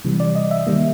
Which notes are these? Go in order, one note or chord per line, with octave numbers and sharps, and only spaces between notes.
C3 E3 G3
D5
D#5
E5
D#3 G3 A#3